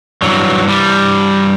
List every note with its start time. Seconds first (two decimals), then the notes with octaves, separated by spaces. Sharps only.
0.22 G2 E3 F#3
0.69 G3